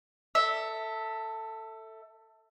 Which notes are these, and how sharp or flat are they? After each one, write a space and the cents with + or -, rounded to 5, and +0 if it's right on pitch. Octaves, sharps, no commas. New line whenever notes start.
A4 +15 E5 -10